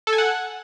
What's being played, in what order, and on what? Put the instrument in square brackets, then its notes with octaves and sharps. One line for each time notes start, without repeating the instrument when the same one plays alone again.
[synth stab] A4
G#5
F#5